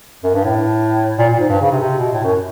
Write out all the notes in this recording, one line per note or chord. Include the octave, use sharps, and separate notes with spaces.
F#2
G2
A2
A#2
A#2
G#2
G2
C#3
C3
C3
B2
A2
F#2